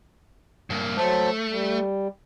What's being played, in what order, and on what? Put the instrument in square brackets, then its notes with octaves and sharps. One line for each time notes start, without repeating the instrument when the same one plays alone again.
[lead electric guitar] G2 A#3
[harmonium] F#3 C5 A5 [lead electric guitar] A3
[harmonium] G3